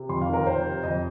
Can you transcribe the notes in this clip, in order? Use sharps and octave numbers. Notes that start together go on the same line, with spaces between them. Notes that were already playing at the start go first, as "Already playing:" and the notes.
Already playing: C3
F2 C6
F5
D#3
A#4
F2 C5
C3
F2 D#5